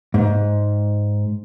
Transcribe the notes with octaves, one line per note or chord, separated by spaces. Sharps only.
G#2